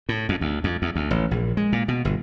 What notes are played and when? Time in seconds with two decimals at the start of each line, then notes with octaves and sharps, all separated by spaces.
0.09 A2
0.29 F2
0.41 D2
0.64 F2
0.82 E2
0.96 D2
1.11 A1
1.31 A#1
1.57 G#3
1.73 A#2
1.88 B2
2.05 G1